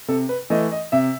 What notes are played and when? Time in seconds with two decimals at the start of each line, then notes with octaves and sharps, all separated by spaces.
0.08 C3 A4
0.29 B4
0.50 E3 A3 D#5
0.72 D#5
0.92 C3 E5